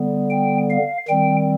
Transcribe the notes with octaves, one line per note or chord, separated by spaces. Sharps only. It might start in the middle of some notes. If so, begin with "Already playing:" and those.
Already playing: D3 G3 B3
G5
F5
D#3 G3 C4 G5